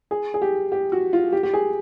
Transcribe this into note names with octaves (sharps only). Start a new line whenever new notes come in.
G#4
G#4
G4
G4
F#4
F4
G4
G4
G#4